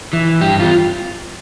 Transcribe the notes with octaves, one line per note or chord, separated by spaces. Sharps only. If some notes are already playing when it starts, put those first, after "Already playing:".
E3
G2 G4
F4